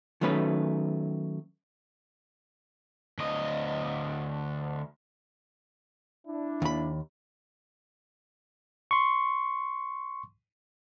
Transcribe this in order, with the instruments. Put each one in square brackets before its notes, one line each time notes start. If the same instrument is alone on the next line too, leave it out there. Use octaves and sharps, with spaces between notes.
[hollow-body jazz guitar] D#3 F#3 A3 C#4 B4
[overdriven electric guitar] D2 D#5
[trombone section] D4 E4
[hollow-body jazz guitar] D#2 B5
[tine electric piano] C6 C#6